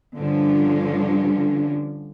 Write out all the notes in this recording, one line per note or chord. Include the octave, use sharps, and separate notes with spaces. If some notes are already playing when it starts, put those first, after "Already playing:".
G2 D3 F3 G3 C#4 D4